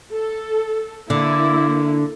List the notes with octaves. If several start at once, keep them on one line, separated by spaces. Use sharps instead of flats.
A4
D3 A#3 E4